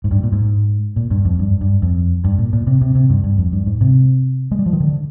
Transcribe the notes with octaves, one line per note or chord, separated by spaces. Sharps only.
G#2
G2
A#2
G#2
A#2
G2
F2
G2
G2
F2
G2
A#2
A#2
C3
C3
C3
G2
G2
F2
G2
G#2
C3
G#3
G3
F3
D#3
D3